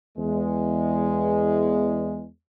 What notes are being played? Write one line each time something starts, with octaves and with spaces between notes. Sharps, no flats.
E2 G#3